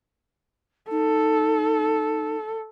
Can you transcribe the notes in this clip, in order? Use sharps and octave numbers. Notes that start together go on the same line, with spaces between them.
D#4 A4